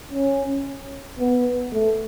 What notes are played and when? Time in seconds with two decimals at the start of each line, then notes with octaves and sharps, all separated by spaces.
0.11 C#4
1.19 B3
1.72 A3